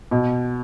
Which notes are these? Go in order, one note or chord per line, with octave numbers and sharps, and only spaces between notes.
B2